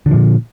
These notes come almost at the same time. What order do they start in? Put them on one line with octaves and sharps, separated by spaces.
D3 D#3 F3 A#2